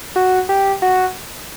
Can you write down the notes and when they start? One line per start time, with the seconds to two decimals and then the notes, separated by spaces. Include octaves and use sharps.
0.16 F#4
0.49 G4
0.82 F#4